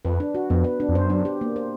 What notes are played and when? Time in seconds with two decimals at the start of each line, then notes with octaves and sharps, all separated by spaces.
0.05 F2 B4
0.20 D4
0.35 F#4
0.50 F2 B3
0.64 B4
0.80 D4
0.89 F2
0.95 F#2 C5
1.10 D4
1.25 G4
1.41 A#3
1.56 C5